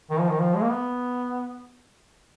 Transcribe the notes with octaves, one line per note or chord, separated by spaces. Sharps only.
D#3
F3
D#3
F3
G#3
A#3
B3